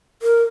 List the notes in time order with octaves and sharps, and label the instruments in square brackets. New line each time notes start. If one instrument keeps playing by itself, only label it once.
[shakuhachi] A#4